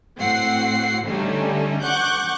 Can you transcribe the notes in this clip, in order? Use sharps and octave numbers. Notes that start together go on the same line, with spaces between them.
A2 C4 F#4 F#5 C7
D3 G3 A3 C#4 D#4
F#5 C#6 D6 F#6 G6